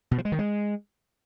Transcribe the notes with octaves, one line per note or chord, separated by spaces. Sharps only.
B2
F3
G#3
D#3
G#3